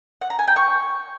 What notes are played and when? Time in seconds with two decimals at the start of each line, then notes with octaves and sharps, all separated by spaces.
0.21 F#5
0.30 A#5
0.39 G#5
0.47 G5
0.56 C#6